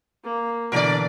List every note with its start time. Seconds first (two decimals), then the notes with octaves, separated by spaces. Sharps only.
0.24 A#3
0.72 B2 D3 E3 A#4 D5